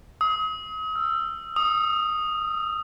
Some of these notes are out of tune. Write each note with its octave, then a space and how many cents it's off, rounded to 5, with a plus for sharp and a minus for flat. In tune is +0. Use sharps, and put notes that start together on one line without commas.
D#6 +40
E6 +35
D#6 -5